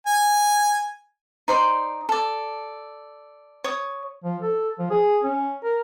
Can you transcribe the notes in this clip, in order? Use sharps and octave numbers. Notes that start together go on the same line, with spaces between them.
G#5
D#4 C5 D5 C6
A4 D5
C#5 D#6
F3
A4
F3
G#4
C#4
A#4